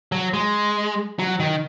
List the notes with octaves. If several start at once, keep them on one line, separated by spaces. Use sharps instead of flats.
F#3
G#3
F#3
D#3